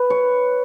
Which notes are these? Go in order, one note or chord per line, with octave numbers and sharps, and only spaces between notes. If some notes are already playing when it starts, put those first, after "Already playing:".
Already playing: B4
C#5